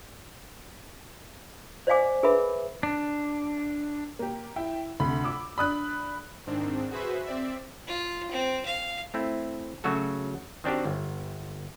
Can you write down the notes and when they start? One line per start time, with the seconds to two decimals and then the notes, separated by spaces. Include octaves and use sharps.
1.87 C5 D5 D#5 F5 G#5 D6
2.23 G#4 A#4 B4 E5 B5
2.83 D4
4.19 A#3 G4
4.56 E4 G5
5.00 D2 C3 B5
5.24 D6 E6
5.58 D4 D5 B5 D#6 F#6
6.47 G#2 D#3 C4 D4
6.91 F#4 G#4 B4 C5 E5
7.26 C4 D5 E5
7.88 F4
8.31 C4
8.66 F5
9.14 A3 C4 E4
9.84 C#3 F#3 A3 F#4 A4
10.64 D#3 C4 D4 F#4 G4
10.85 G1